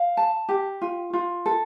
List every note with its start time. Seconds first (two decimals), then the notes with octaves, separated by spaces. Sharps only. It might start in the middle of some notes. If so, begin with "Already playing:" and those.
Already playing: F5
0.17 A5
0.49 G4
0.82 F4
1.13 F4
1.46 A4